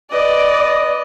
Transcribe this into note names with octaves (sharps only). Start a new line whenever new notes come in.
B4 D5 D#5